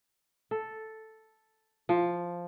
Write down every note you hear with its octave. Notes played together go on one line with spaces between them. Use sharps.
A4
F3